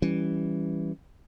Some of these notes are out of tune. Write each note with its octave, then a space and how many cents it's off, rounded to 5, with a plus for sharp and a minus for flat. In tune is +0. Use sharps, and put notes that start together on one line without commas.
E3 +0 G3 +0 C#4 +0